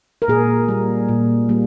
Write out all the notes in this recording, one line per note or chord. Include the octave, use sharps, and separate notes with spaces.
A#4
A#2 G#4
G3 A#3
A#2
G3 A#3